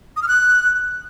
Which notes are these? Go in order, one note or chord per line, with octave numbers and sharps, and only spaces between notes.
D#6
F6
F#6